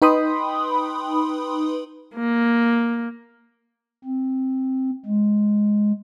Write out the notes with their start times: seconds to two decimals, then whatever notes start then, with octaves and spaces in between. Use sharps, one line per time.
0.02 D#4 B4 G5 B5 C6 D#6
2.15 A#3
4.04 C4
5.06 G#3